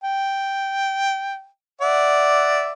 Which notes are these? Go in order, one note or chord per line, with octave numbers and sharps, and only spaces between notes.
G5
D5 E5 F#5